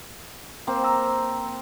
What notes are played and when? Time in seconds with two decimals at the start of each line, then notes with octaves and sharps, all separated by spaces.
0.67 A#3 C4 C5
0.84 A#5 E6